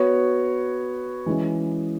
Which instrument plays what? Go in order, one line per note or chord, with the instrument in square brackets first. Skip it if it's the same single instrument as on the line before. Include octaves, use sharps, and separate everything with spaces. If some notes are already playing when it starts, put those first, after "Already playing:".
Already playing: [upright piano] B3 F#4 C#5
E3 G#3 C#4